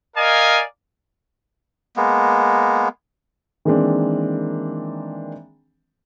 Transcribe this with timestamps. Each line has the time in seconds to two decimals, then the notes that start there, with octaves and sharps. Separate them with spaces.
0.16 A#4 D5 D#5 F5 G#5
1.97 G#3 A#3 B3
3.65 D#3 E3 G#3 A#3 C4 D4